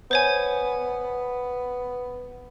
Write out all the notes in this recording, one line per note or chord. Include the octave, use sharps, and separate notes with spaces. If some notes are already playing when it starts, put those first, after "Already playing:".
B3 C5 C#5 G#5